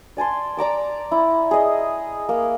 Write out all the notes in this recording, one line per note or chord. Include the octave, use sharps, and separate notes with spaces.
D5 G#5 A5 C6
D5 A#5 D6 E6
E4
G#4 D#5
A#3